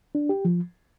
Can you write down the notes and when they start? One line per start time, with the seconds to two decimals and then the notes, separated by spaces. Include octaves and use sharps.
0.15 D4
0.29 G4
0.45 F3